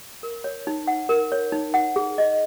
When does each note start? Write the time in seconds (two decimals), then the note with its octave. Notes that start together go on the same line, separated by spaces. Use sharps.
0.23 A#4
0.44 C#5
0.67 D#4
0.87 F#5
1.09 A#4
1.32 C#5
1.52 D#4
1.74 F#5
1.96 G#4
2.18 D#5